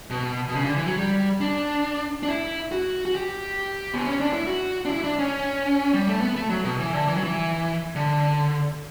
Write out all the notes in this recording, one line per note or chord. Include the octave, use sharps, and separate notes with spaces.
B2
B2
C#3
D3
E3
F#3
G3
D4
D4
E4
F#4
F#4
G4
B3
C#4
D4
E4
F#4
D4
E4
D4
C#4
G3
A3
B3
A3
F#3
B2
E3
D3
E3
F#3
E3
D3